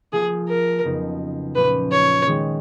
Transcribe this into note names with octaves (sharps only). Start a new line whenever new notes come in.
F3 A#3 F4 G#4
A#4
F2 C#3 F#3 B3 D#4
A#2 F3 A#3 C#4 B4
C#5
D#3 G#3 D#4